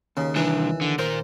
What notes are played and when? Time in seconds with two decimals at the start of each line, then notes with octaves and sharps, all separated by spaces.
0.17 D#2 C#3
0.36 C2 E3 D4
0.81 D3
0.99 A#2 A#4 C5